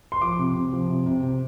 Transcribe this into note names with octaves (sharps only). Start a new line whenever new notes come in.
C6
F3 D6
C3
C3
F3
C3
C3
C3